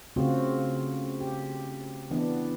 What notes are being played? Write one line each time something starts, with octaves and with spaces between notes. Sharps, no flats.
C#3 A3 C4 F4 F#4
G4
E3 B3 D4